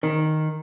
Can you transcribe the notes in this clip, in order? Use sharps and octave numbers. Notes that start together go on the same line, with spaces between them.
D#3